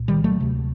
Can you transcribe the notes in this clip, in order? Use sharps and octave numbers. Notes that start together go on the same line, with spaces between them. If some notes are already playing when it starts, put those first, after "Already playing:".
Already playing: C2 A#2
D#3 G3
F#3 A3
D2 C3